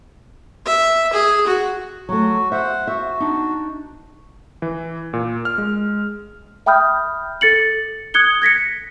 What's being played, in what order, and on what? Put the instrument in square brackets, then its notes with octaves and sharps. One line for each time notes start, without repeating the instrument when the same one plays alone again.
[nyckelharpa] E5
G#4
F#4
[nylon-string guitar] F#3 A3 [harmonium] F#4
[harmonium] C5 F#5 [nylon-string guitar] E5
[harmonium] F#4 [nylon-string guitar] E5
[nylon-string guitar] D4 D#4
[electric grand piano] E3
A#2
F6
G#3
[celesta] E5 G5 B5 D#6 F6 G6
A4 A6 C#7 F#7
D#6 F#6 G#6 C#7 G7
G#6 A#6 B6 C#7